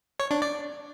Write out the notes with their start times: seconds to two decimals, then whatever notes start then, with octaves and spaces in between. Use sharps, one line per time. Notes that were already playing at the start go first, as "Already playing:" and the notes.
0.20 C#5
0.31 D4
0.42 D5